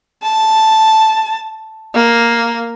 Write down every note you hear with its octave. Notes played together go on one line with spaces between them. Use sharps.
A5
A#3